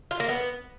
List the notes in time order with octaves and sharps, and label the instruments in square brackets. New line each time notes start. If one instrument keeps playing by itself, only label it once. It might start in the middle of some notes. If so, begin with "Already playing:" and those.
[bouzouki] F4
A#3
B3